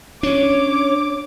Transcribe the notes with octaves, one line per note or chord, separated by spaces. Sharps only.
C#4 D4 C#5 D6